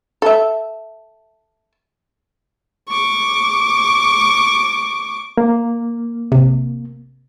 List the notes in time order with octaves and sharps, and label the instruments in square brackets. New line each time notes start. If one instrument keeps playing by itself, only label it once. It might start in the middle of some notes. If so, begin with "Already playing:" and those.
[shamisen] A4 E5
[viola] C#6 D6
[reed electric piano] A#3
[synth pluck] G#1 C3